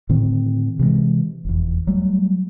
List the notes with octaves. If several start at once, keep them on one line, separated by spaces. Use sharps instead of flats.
A2 D3 D#3 C4
C3 E3 F#3 G#3
F1 E2
F#3 G3 A3